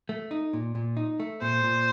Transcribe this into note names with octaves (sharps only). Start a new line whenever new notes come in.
A3
D#4
A#2
A#2
D#4
A3
A#2 C5
A#2